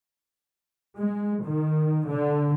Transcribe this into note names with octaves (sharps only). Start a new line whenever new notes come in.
G#3
D#3
D3